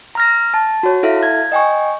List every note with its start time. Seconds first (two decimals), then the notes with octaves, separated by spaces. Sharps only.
0.15 A#5 F6 A#6
0.54 A5
0.83 F#4 C#5
1.03 E4 A4 E5 F5
1.23 G#6
1.52 D#5 G5 G#5 C#6